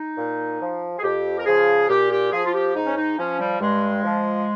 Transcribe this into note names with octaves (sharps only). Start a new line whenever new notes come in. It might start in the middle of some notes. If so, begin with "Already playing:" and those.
Already playing: D#4
A#2
F3
G#4
F2 G4
A#4
C#3 F3 G#4
A#2 G4
G4
F3 G#4
F4
G4
G#2 D#4
C#4
D#4
F3 C#4
G3
G2 G#3
F3